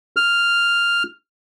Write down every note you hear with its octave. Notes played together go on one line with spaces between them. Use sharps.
F6